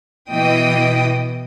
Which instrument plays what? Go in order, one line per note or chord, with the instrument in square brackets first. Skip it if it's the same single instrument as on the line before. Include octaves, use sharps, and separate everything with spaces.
[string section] B2 E3 D#5 G5 D#6